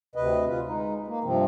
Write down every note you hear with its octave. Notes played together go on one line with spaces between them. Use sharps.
D2 C3 B4 D#5
F4 B4
G#3 D#4
A#3
G2 C3 F3 C4